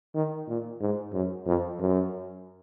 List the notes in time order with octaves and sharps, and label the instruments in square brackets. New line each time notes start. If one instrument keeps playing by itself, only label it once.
[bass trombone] D#3
A#2
G#2
F#2
F2
F#2